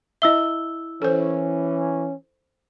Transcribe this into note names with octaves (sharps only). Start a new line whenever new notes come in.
E4 D#5 E5 E6 G7
E3 C#4 A4 C5